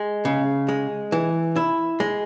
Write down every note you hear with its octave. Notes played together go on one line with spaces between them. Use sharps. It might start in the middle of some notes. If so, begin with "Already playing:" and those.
Already playing: G#3
C#3
G#3
E3
E4
G#3